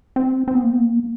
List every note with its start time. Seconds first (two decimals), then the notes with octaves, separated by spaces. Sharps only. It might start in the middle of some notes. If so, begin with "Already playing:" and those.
0.16 C4
0.48 C4
0.55 B3
0.63 A#3
0.70 B3
0.78 A#3